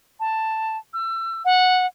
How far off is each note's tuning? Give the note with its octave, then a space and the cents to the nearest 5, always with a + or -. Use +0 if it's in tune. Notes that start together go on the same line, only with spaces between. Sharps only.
A5 +5
E6 +30
F#5 -10